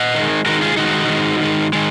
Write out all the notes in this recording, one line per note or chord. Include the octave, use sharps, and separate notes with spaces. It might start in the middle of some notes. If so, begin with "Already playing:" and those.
Already playing: D#5 F#5
D#3 G#3
D#3 G#3 F#4 A#4
F4 G#4
D#3 G#3 D#4 F#4
D#3 G#3
D#3 G#3
D#3 G#3